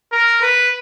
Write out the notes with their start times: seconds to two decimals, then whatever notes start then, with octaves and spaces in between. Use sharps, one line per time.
0.12 A#4
0.42 B4